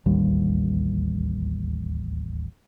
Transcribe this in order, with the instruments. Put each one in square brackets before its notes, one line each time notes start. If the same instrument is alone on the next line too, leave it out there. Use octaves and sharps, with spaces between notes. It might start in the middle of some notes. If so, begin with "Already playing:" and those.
[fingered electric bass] D1 A1 D#2 G3